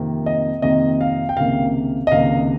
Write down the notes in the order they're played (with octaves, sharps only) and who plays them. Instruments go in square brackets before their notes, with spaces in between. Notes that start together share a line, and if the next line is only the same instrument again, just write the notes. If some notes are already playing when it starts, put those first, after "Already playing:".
Already playing: [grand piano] F2 C3 D#3 A#3
D#5
F2 C3 D#3 A#3 D#5
F5
G5
C#2 C3 D#3 A#3 F5
D#5
C#2 C3 D#3 A#3 F5